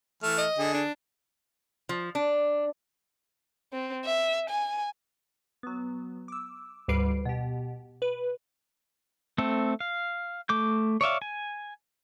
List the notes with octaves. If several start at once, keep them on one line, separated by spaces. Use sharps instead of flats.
E3 A3 F6
D#5
D3 G#4
D4
F3
D4
C4
E5
G#5
F#3 B3
D6 E6
D2 G#2 G3 B4 C7 D7
B2 G4
B4
A3 C4 A4
F5
A3 D6 G6
C#5 D5 E5 F5
G#5